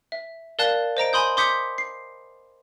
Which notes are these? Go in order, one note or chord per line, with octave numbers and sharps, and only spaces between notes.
E5
A#4 D5 F5 A5 F#6 A6
C5 D#5 A#5 D7
G#5 B5 C6 D#6 G6
C6 D6 D#6 G6 B6 C#7
C7